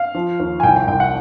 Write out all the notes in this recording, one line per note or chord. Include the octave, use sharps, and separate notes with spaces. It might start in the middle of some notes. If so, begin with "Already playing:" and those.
Already playing: F5
F3
D#2
G#5
C2 G5
G5
C2 G5
F#5